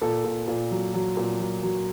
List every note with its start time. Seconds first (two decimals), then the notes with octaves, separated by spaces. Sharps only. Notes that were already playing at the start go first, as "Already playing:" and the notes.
0.02 A#2 A4
0.24 A#2
0.48 A#2
0.71 F#3
0.94 F#3
1.17 A#2
1.40 F#3
1.63 F#3